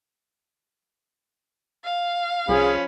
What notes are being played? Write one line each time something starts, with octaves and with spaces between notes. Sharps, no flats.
F5
C2 F3 C#4 G#4 B5